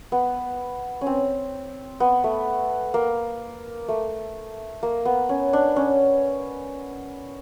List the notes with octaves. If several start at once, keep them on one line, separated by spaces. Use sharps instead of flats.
B3
C#4
C4
B3
A3
A#3
A3
A#3
B3
C#4
D4
C#4